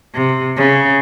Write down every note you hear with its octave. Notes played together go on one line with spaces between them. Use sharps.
C3
C#3